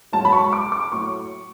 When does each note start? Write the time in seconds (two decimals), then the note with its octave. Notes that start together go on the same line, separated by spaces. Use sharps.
0.13 G#2 F#3 A5
0.25 B5
0.33 C#6
0.53 D6
0.72 D6
0.91 A2 F#3 C#6